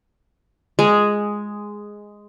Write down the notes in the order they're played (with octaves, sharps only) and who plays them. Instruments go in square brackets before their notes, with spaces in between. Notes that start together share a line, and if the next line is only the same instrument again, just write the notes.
[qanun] G#3